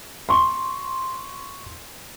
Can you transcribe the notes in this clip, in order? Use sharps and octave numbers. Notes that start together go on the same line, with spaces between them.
C6 C#6